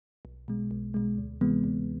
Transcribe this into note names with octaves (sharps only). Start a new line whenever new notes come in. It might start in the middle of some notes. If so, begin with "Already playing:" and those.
B1
B2 G#3
B1
B2 G#3
D2
C3 E3 G#3 B3
D2